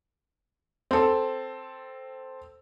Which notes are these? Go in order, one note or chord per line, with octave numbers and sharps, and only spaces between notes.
C4 A4